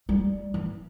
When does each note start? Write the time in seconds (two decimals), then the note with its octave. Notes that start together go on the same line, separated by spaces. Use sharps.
0.09 G3
0.54 E3